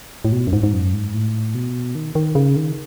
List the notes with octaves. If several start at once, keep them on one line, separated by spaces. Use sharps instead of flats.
A2
B2
F#2
G#2
G#2
F#2
G#2
A2
B2
D#3
D#3
C#3
D#3